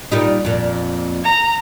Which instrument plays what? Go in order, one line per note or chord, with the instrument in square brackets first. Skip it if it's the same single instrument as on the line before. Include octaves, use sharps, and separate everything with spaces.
[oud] A#2 G3 D#4
F2 A#2
[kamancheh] A#5